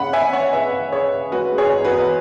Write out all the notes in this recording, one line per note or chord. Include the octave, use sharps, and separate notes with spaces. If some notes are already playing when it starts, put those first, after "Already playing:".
Already playing: C#3 C#4 F#5 B5
C#3 E5 G#5
C#4 C#5 F#5
C#3 B4 E5
C#3
C#3 G#4 C#5
C#3
G#3 F#4 B4
G#3
G#4 C#5
E2
F#4 B4
E2